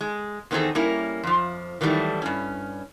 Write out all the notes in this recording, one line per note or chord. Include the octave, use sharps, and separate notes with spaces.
G#3
E2 D#3 C4 D#4 G#4 A4
G3 A#3 C#4 E4 A#4
F2 F3
D#3 E3 F#3 G3 A3
G2 C#4